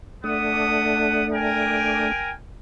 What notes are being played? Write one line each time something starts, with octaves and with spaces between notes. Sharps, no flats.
A3 B3 D4 F#5 D#6
A#4 G5 G#5